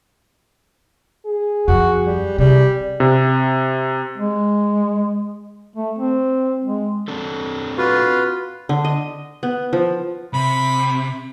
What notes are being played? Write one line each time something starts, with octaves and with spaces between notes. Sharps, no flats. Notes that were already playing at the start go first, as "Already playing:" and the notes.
G#4
F2 F#4
G3
C3 G3 G#4
C3
G#3
A3
C4
G#3
C4 D4 A4
F4 F#4 B4
D3
D#5
B3
F3
C3 B5